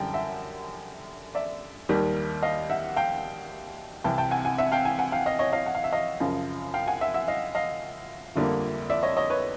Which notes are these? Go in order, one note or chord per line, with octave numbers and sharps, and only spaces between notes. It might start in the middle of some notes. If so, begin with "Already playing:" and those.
Already playing: F#2 D3 G3 G5 A5
E5 F#5
D5 E5
D#2 D#3 G3
D#5 F5
E5 F#5
F5 G5
C2 C3 E3 G5 A5
G5 A5
F#5 G#5
F#5 G#5
E5 F#5
F5 G5
F#5 G#5
F#5 G#5
F5 G5
D#5 F5
C#5 D#5
D#5 F5
F#5
F5
E5
D#5 F5
F#2 C#3 F3
F5 G5
F#5 G#5
E5 F#5
E5 F#5
D#5 F5
D#5 F5
G1 F2 D3 G3 A#3
D5 E5
C#5 D#5
C#5 D#5
B4 C#5